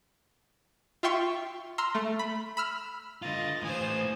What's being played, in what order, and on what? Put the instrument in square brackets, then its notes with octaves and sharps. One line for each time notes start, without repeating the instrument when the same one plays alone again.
[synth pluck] F4 E5 G5 C6 C#6
A#5 C6 E6 F6
A3
B5
B5 E6 F6
[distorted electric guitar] D3 F4 [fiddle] D#5 [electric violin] A6
[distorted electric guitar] A2 E3 [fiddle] C5 F5 [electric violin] G#5 D#6